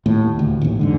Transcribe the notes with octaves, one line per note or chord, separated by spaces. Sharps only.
D#2 A2
D2
A1 D#2
E2 G#2 D3